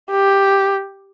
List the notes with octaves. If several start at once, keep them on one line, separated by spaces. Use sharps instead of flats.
G4